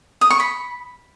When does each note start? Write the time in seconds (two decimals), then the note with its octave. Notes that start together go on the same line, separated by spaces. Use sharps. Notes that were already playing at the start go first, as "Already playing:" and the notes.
0.21 D#6
0.30 C#6
0.40 B5